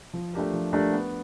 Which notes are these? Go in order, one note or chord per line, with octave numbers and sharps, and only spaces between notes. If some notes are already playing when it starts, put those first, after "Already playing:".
F3
A3 D4 G4 A#4
F3
A3 D4 G4 A#4
B3